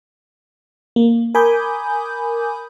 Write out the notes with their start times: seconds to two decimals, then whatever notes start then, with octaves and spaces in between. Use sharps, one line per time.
0.96 A#3
1.35 A#4 G#5 B5 D6 D#6 G6